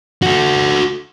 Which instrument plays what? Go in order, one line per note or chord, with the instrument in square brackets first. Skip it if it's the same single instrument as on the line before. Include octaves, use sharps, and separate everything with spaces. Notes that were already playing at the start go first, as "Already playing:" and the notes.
[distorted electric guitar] F#4 A4